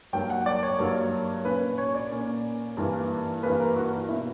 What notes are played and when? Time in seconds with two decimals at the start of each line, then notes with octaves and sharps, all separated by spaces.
0.13 G2 F#3 A#3 G5
0.30 F#5
0.46 D5
0.63 C#5
0.79 G2 F#3 A#3
1.45 A#2 A#3 C#4 B4
1.78 C#5
1.95 D5
2.11 A#2 A#3 C#4
2.77 G2 E3 A#3
3.43 G2 E3 A#3 B4
3.60 A#4
3.77 F#4
4.09 B2 A#3 E4